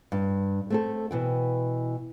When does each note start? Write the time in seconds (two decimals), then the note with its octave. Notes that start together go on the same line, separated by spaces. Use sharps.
0.12 G2
0.70 A3 C4 A4
1.11 B2 E3 G5